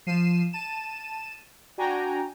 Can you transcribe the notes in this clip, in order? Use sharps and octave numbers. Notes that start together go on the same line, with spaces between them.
F3 C7 D#7 E7
A5 D#7 E7
D4 F#4 G5 G#5 A#5